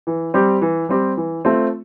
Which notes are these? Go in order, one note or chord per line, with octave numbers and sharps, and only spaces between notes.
E3
G3 C4 G4
E3
G3 C4 G4
E3
A3 C4 F4